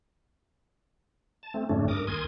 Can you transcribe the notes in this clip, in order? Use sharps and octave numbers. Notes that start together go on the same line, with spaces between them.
A5
A3 C4
F2 G#2 C#3 A3 C#4 D4
G2 A#4 D6 D#6
D#2 A#4 G#5 C6 D#6 G#6